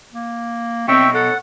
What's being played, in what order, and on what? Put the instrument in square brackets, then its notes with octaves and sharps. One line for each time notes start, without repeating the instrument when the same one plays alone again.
[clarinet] A#3
[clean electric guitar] B2 C#5 D#5 [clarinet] C4 [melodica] E5 G5 C#6
[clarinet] A4 [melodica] F#5